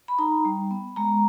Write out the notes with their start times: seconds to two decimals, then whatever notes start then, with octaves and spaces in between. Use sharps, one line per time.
0.08 B5
0.19 D#4 A#5
0.45 G3
0.71 B3
0.96 G#3 A#5